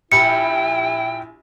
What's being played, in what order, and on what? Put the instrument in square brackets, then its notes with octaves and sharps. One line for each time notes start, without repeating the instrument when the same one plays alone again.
[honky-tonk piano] A#1 G4 B5 [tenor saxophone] E4 [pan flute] G5 [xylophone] C#7